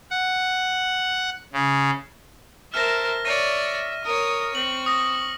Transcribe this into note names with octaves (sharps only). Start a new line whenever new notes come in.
F#5
C#3
A#4 C5 E5 A5 F6 A#6
C#5 D5 E5 A#6 D#7
A#4 C#5 D#6
C4 C#6 F#7
D#6 A#6